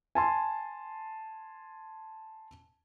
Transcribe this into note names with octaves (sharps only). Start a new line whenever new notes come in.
G#5 A5 C6